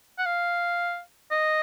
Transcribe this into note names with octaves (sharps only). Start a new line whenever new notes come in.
F#5
F5
D#5